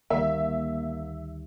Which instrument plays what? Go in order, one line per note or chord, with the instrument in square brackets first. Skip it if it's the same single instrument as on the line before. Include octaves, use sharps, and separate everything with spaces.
[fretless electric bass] D2 D#3 G3 [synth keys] A#3 [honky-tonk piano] E5